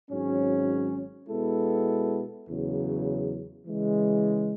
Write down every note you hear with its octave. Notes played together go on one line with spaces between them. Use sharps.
G#1 G#2 F#3 C#4
B2 G#3 B3 E4 A4
E2 C#3 F#3
C#3 E3 G#3